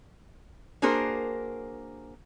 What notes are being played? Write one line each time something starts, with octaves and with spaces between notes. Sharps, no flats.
A#3 D4 F#4 G#4 A#4 C5